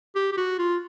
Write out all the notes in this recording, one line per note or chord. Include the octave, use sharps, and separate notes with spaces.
G4
G4
F#4
F4